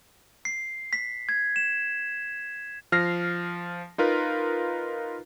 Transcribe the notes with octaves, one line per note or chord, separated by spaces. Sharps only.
C7
B6
G#6
E7
F3 F6 A#6 C7
D#4 F4 A#4 B4